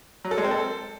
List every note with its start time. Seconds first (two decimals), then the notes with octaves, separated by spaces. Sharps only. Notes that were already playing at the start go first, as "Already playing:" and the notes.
0.25 F#3
0.31 A4
0.38 G#3
0.44 C4
0.51 A4